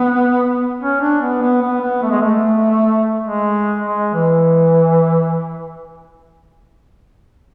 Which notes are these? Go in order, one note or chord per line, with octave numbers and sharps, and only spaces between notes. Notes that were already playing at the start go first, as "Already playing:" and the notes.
Already playing: B3
C#4
D4
B3
B3
B3
B3
A3
G#3
A3
G#3
G#3
E3